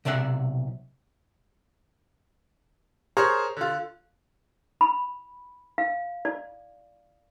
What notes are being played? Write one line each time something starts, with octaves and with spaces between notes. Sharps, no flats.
B1 C3 D5 E5 F#5
G#4 A#4 C5 C#5
D3 F4
B5
F5
D5